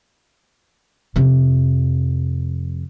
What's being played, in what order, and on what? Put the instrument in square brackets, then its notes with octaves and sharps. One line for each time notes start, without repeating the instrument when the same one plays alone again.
[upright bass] F2 C3